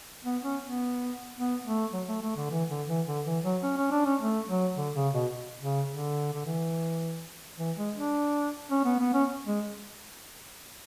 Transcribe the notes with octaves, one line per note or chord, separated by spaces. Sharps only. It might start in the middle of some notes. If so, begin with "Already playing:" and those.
B3
C#4
B3
B3
A3
F#3
A3
A3
D3
E3
D3
E3
D3
E3
F#3
C#4
C#4
D4
C#4
A3
F#3
D3
C#3
B2
C#3
D3
D3
E3
E3
G#3
D4
C#4
B3
B3
C#4
G#3